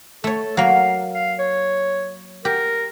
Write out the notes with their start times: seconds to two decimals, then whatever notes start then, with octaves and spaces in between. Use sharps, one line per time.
0.24 A3 A4 C#5
0.57 F#3 A#3 F5
1.15 F5
1.39 C#5
2.45 G4 A#4